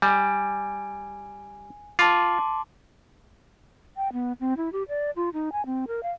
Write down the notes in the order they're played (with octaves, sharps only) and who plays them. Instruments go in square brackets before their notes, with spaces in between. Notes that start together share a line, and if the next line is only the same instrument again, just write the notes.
[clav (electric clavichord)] G3 [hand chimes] G#5
[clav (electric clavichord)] F4 [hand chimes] A5 C6 D6
[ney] G5
B3
C4
E4
G4
D5
F4
D#4
G#5
C4
A#4
F5